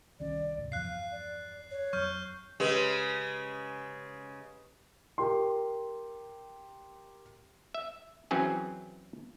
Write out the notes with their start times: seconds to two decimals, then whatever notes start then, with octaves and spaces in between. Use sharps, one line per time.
0.20 C2 D#3 C#4 D5
0.57 C#2 G#2 C3
0.72 E2 G2 F3 F5 F#6 C7
1.12 D5
1.71 C#5
1.93 F2 F#3 C#6 F6 G6
2.60 C#3 G#3 G4 B4
5.18 G4 A#4 C6
7.74 E5
8.31 E3 F#3 C4 C#4 G#4